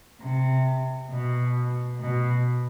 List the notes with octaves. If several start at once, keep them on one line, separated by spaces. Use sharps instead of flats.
C3
B2
B2